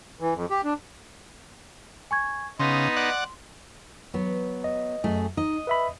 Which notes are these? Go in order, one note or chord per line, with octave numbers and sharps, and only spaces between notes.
E3
F2
G4
D4
G#5 C#6 G#6
C#3 B3 D#4 D#5 C6
D5 F#5
F#3 B3
D#5
F#2 A3 G#4
D#4 D#5
B4 E5 B5